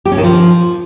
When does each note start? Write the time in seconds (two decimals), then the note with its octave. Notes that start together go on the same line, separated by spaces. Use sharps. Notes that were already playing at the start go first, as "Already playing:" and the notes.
0.05 G4
0.12 C#4
0.18 D#3
0.24 F3